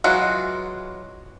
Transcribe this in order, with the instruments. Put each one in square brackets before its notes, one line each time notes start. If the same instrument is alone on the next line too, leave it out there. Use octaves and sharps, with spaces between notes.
[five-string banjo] E3 F#3 G#3 F4 F#4